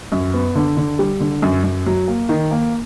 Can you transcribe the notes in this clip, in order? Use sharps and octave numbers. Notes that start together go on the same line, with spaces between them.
F#2
B3
D3
D3
G3
D3
F#2
F#2
F#3
A#3
D#3
A#3